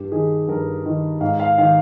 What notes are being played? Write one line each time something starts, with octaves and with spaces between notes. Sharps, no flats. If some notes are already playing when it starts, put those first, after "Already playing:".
Already playing: G2 G4
D#3 G#4
G2 A#4
D#3
G#2 F5
F5
D#3 F5